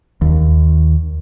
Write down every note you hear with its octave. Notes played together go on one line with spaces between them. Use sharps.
D#2